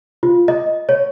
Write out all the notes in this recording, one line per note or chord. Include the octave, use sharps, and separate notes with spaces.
F4
D#5
C#5